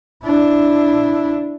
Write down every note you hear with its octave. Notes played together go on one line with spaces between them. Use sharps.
D4 E4